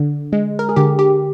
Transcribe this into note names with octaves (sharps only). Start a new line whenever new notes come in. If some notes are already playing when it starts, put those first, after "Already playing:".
Already playing: D3
G#3
A#4
G#4
D3 G4
G4